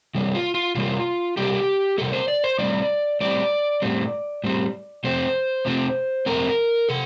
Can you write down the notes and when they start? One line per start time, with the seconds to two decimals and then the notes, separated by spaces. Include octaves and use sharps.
0.15 C3 G3 A#3
0.35 F4
0.54 F4
0.75 C3 G3 A#3 F4
1.37 C3 G3 A#3 G4
1.98 C3 G3 A#3 A4
2.13 C5
2.28 D5
2.44 C5
2.59 A2 G3 C4 D5
3.21 A2 G3 C4 D5
3.82 A2 G3 C4
4.44 A2 G3 C4
5.04 F2 C3 F3 A3 C4 C5
5.65 F2 C3 F3 A3 C4
6.26 F2 C3 F3 A3 C4 A#4
6.89 C3 A4